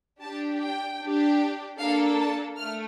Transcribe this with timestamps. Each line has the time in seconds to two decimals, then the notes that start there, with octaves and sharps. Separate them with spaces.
0.22 D4 G4 A5
0.62 G5
1.00 D4 G4
1.78 A#3 D4 A4 F5
2.19 A5
2.57 A3 F6